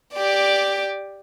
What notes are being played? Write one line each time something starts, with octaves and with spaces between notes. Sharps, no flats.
G4 D5